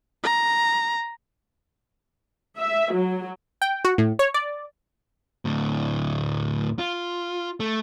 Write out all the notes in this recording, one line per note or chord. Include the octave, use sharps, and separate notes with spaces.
A#5
E5
F#3
G5
F#4
A2
C#5
D5
D2 A2
F4
A3